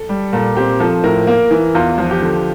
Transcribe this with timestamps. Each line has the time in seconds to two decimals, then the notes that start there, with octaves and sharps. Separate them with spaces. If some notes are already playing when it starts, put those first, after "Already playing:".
Already playing: A4
0.09 G3
0.33 A#2 A4
0.57 C4 G4
0.80 F3 A4
1.04 A2 A#4
1.27 A#3
1.51 E3
1.75 E2 F4
1.98 F3
2.11 G4
2.22 D3